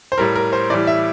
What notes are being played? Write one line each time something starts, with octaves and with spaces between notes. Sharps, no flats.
C5
A2 G3 A#4
A#4
C5
A2 E3 G3 D5
E5